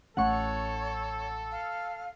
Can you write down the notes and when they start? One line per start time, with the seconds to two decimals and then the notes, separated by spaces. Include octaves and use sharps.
0.17 A1 A3 C#4 A4 C#5 F#5 C#6
1.51 F5